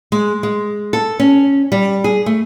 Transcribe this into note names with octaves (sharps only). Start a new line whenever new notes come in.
G#3
G#3
A4
C#4
G3
G#4
A3